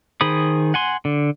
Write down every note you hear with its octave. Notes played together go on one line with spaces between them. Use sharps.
D#3 G#4 C5 B5 D#6
F#5 G#5 C6
D3